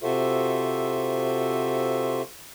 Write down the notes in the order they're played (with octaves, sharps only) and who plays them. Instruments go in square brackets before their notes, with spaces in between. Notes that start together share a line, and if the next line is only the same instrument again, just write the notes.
[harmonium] C3 F4 F#4 A4 C5 E5